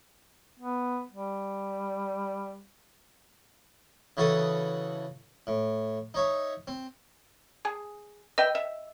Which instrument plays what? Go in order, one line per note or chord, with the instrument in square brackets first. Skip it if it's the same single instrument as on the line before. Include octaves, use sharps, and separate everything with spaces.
[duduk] B3
G3
[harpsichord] C#3 E3 F#4 A4 A5 D#6
A2
D#4 C#5 E5
C4
[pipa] G#4
[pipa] B4 E5 G5 [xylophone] D#5
[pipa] E5